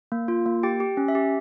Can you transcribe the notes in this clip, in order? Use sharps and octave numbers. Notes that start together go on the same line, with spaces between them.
A#3
F4
A#3
G4 G5
G4
C#4
E5
G4